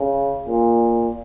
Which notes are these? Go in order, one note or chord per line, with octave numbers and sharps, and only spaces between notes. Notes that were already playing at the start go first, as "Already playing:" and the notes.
Already playing: C#3
A#2